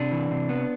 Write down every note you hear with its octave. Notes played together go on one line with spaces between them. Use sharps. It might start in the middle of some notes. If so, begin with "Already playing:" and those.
Already playing: C3 D4
E3
C3
B3